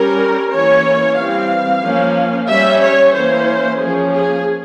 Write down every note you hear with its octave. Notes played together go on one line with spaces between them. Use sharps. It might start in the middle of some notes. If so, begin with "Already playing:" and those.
Already playing: G3 C#4 A#4
E3 A#3 C#4 C#5
E3 G3 C4 F5
F3 A#3 C#4
G3 C#4 E5
C#5
E3 A#3 C#4 C5
F3 A#3 C#4 G#4
G#4